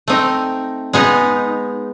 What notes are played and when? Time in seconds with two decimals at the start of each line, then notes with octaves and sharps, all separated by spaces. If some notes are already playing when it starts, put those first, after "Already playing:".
0.08 A3 C4 D#4
0.93 G#3 B3 D#4